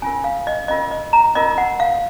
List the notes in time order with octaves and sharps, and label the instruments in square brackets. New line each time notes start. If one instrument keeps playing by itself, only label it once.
[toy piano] C#4 F4 A#4 G#5
F5
D#5
C#4 F4 A#4 D#5
D#5
A#5
C#4 F4 A#4 D#5
F#5
F5